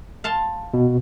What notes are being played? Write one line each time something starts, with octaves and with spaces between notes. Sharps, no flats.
F5 A5 C6
B2